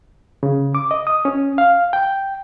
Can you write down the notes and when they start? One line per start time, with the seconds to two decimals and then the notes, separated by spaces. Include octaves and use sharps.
0.43 C#3
0.75 D6
0.91 D#5
1.07 D#6
1.25 C#4
1.58 F5
1.93 G5